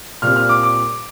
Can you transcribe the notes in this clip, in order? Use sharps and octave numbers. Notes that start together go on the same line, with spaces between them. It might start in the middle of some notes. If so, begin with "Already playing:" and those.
A#2 G3 C4 F6
F6
D6
D6